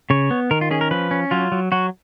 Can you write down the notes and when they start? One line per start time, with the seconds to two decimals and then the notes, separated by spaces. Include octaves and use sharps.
0.10 C#3 C#5
0.31 B3
0.51 D#3 A#4
0.61 F4
0.71 C#4 G#4
0.81 A#4
0.91 F3 B4
1.11 C#4
1.31 F#3 F4
1.52 F#3
1.72 F#3 F#4